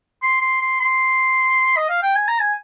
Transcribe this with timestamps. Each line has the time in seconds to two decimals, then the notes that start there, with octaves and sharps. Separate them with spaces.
0.22 C6
0.41 C6
0.61 C6
0.80 C6
1.77 D#5
1.89 F5
2.03 G5
2.16 G#5
2.28 A#5
2.41 G#5